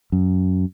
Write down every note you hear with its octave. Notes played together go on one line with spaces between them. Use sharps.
F#2